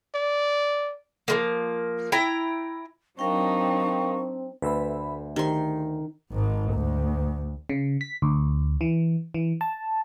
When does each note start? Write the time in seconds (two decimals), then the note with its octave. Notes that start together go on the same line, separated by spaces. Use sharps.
0.15 D5
1.28 F3 G#3 A#3
2.12 E4 G5 A#5
3.19 F#3 C4 D4 D#4 A#4 F5 G5 C#6
4.62 D2 B4 E5 B5
5.36 D#3 G4 C5 C6
6.32 G#1 G#2
6.73 D2
7.69 C#3
8.01 B6
8.22 D2
8.81 E3
9.34 E3
9.61 A5